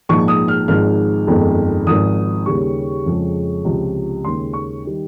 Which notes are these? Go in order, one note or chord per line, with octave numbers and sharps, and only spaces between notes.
A#1 G#2 F3 G#3 C#6
D#6
F6
G#1 G#2 F3 G#3 F6
G1 F2 D#3 G#3
G#1 G#2 F3 D#6
D#2 C#3 G3 C#6
F2 C#3 F3 G#3
C#2 C3 F3
D#2 C#3 G#3 C6
C#6
D#3 G3